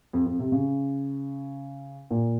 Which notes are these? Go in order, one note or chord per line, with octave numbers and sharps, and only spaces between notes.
F2
F2
C3
C#3
A#2